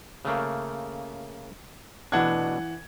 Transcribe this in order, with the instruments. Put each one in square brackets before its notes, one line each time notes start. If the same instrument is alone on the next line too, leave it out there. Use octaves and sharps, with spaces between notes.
[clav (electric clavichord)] C#3 A3 A#3
[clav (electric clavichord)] B2 A3 D4 [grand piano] E3 F#5 G#6